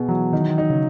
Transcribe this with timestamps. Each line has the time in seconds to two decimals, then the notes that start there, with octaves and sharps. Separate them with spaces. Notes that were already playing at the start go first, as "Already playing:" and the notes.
Already playing: B2 G#4
0.08 E3 F#3
0.33 D#3 D#4
0.40 E3
0.48 D#3
0.58 D#4
0.70 C#3